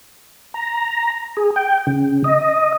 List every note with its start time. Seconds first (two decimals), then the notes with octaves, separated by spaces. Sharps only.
0.54 A#5
1.37 G#4
1.56 G5
1.87 C#3
2.24 D#5